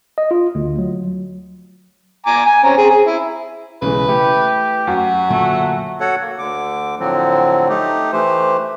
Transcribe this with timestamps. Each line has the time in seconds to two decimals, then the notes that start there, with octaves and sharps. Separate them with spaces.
0.18 D#5
0.31 F4
0.55 D2
0.78 F#3
2.26 G#5 A#5 D6
2.46 G#5
2.64 C4 C#4 A#5
2.78 C4 G#4
2.90 G#4
3.07 E4
3.82 B1 C#3 E3 G#3 B4
4.08 A3 E4 G4
4.87 F#2 F#4
5.30 A#2 D3 F#3 A3
6.00 F#4 A4 C#5 F#5
6.21 A#3
6.39 D2 D3 D6
7.00 A2 D3 F3 F#3 C4
7.69 A3 D#4 G4
8.13 E3 A3 G4 C5